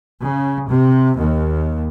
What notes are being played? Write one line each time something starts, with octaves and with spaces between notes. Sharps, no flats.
C#3
C3
D#2